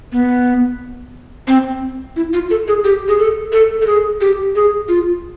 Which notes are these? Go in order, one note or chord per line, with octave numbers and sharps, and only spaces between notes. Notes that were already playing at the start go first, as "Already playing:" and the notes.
B3
C4
E4
F4
A4
G#4
G4
G#4
A4
A4
A4
G#4
G4
G#4
F4